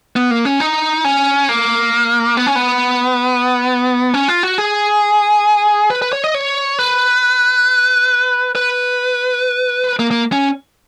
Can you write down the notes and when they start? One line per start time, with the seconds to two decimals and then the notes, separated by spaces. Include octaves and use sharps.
0.16 B3
0.31 A#3
0.45 C#4
0.60 D#4
1.05 C#4
1.49 A#3
2.37 B3
2.47 C#4
2.56 B3
4.14 C#4
4.28 F4
4.43 F#4
4.58 G#4
5.91 B4
6.02 B4
6.13 C#5
6.24 D#5
6.34 C#5
6.79 B4
8.56 B4
9.99 A#3
10.11 A#3
10.32 C#4